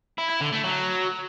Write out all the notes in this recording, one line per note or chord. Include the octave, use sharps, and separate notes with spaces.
E4
E4
D3
A3
F#3